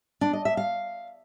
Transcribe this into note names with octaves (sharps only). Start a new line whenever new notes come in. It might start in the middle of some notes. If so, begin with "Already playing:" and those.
D4
D#5
E5
F5